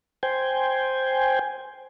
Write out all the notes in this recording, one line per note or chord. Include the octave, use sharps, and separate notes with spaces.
C5 G5 G#5